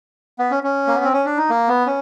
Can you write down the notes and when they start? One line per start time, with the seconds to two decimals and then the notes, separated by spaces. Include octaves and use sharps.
0.39 B3
0.51 C#4
0.63 C#4
0.87 A#3
0.96 B3
1.04 C4
1.13 C#4
1.25 D4
1.37 D#4
1.50 A#3
1.68 B3
1.86 C#4